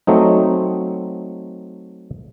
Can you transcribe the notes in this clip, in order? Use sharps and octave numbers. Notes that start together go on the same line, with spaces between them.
F#3 A3 C4 D#4